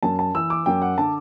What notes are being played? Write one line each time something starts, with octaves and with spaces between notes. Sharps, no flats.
F#2 A5
A5
E3 E6
D6
F#2 G5
F#5
D3 A5